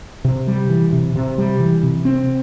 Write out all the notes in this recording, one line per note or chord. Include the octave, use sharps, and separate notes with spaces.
C3
G3
E3
C3
C3
G3
E3
C3
C4